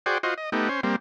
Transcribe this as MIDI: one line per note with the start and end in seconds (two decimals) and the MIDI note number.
0.06 0.18 66
0.06 0.18 68
0.06 0.18 72
0.06 0.18 74
0.06 0.18 79
0.23 0.34 65
0.23 0.34 66
0.23 0.34 72
0.23 0.34 75
0.38 0.50 75
0.52 0.69 57
0.52 0.69 59
0.52 0.69 63
0.52 0.69 67
0.69 0.81 61
0.69 0.81 72
0.83 0.96 55
0.83 0.96 58
0.83 0.96 60